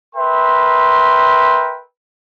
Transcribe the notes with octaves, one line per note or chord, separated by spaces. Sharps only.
A#4 B4 E5 G5 C6